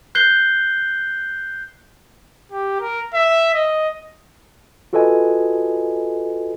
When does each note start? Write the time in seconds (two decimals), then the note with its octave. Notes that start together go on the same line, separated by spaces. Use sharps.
0.15 F#6 G6 C7 G7
2.52 G4
2.80 A#4
3.14 E5
3.54 D#5
4.93 F4 F#4 A4 B4 D#5 G#5